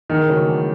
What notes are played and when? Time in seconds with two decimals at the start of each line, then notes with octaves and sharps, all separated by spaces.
0.10 E2 D#3
0.28 C#3 F#3 A3 C#4
0.48 E2